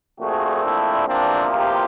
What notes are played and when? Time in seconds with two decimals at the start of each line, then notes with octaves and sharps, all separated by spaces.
0.20 A#1 A#2 F3 A3 C4 F#4 G#4
0.64 D4 E4
1.08 E2 C3 F3 A#3 C4 D4
1.52 F4 G4